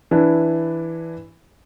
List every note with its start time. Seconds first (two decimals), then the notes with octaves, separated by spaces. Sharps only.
0.11 E3 D4 E4